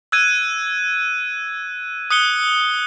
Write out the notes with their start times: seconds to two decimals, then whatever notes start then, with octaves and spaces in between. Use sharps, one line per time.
0.12 E6 F#6 G#6 D#7
2.11 D#6 F#6 C#7 G7